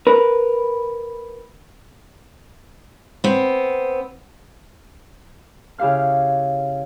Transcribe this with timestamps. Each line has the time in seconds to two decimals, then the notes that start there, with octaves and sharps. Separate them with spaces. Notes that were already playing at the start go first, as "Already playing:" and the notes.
0.07 A#4 B4
3.24 B3 C4
5.78 C#3 E4 G4 F5 F6